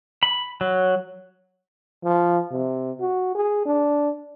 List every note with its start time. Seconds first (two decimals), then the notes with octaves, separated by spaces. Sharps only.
0.23 B5
0.61 F#3
2.04 F3
2.51 C3
3.00 F#4
3.35 G#4
3.65 D4